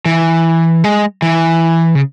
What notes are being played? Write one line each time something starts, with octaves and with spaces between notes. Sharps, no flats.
E3
G#3
E3
C#3